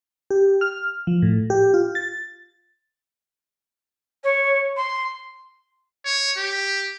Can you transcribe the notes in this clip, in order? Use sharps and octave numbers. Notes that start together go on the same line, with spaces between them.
G4
F6
F3
A2
G4
F4
A6
C#5
C6
C#5
G4